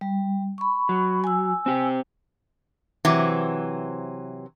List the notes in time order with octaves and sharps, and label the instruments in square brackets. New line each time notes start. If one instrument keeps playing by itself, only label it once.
[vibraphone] G3
B5 C#6
[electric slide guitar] F#3
[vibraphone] G#5 E6
[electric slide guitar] C4 G4
[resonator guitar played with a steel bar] C3 E3 F#3 C4